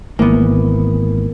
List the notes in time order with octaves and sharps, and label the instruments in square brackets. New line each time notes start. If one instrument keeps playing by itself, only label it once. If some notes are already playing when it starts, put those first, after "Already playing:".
[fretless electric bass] G#1 E3 [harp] A#3 B3